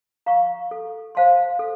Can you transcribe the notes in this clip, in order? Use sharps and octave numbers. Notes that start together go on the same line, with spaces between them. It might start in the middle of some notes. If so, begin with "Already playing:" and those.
F5 A#5 C#6
A4
C5 F5 A5 C6
A4